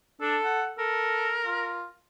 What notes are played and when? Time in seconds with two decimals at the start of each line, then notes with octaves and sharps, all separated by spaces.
0.21 D4 A4
0.44 F#5
0.79 A4 A#4
1.46 F4